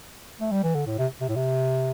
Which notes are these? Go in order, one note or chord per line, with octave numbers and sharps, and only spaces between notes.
A3
G3
E3
D3
A2
C3
C3
A2
C3